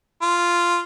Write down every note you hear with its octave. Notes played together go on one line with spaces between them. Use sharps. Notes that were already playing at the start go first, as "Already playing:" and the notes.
F4